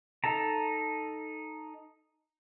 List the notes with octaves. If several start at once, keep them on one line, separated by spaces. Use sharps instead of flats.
D#4 A4 A5 A#5